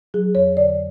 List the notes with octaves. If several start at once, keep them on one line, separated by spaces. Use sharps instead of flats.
F#3 G#4
F2 C#5
D3 D5